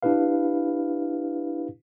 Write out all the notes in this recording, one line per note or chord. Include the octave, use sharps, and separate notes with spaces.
D4 E4 G4 B4 F5